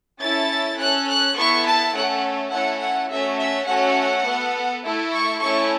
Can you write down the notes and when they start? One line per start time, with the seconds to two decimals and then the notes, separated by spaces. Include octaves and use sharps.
0.19 C#4 E4 A4 A6
0.77 C#4 A4 F#6
1.06 F#6
1.35 B3 E4 A4 C#6
1.65 A5
1.93 A3 C#4 A4 F#5
2.51 A3 C#4 E4 A4 F#5
2.81 F#5
3.10 A3 C#4 F#4 A4 E5
3.39 E5
3.67 A3 C#4 F#4 A4 F#5
4.25 B3 A4
4.84 A3 E4 A4
5.13 C#6
5.41 A3 C#4 E4 A4 C#6